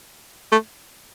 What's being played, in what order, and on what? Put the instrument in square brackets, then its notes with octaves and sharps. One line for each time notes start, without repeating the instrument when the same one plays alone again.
[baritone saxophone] A3